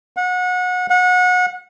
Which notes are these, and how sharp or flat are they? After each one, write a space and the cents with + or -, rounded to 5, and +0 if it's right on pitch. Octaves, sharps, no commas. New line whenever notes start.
F#5 -30
F#5 -30